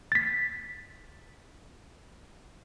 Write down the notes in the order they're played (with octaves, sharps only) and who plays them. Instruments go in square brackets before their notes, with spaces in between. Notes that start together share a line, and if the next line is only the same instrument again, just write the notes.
[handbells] A6 B6